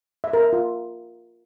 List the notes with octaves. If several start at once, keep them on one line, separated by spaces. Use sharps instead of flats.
E5
A#4
E5
F4